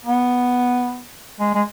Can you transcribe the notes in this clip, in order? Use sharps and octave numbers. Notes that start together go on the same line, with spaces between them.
B3
G#3
G#3